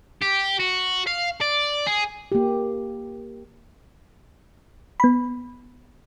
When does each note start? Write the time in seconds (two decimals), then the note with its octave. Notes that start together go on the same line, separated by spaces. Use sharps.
0.22 G4
0.60 F#4
1.07 F5
1.41 D5
1.87 G#4
2.32 A#3 G4
5.00 B3 B5